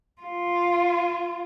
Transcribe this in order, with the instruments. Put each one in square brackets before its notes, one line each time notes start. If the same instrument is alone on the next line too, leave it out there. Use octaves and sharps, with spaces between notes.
[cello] F4